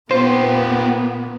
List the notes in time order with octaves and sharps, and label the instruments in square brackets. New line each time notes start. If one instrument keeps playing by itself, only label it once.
[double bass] A#2 A#3 [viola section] B3 [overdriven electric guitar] F4 G4 [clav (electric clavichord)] C5